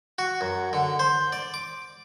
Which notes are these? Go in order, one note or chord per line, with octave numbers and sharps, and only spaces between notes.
F#4
F#2
D3
C5
D5
D6